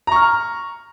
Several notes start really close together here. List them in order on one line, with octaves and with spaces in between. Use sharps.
A#5 C#6 F6